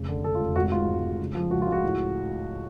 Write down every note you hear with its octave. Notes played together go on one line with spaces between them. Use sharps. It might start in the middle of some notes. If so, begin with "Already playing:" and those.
Already playing: F1 C#3
D3
D3 A4
F4
F1
G#1 F#4
G#2 F4
G#1
G#2
C#3
F3
C#2 F#4
F4
C#2
F#4
A2